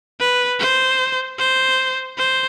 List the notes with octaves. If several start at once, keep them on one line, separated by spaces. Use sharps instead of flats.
B4
C5
C5
C5